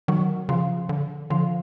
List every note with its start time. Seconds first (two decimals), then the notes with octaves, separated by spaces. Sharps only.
0.08 D#3 F#3
0.49 C#3 F3
0.89 D3
1.30 D3 F3